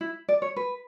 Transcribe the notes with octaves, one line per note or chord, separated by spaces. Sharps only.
E4
D5
C#5
B4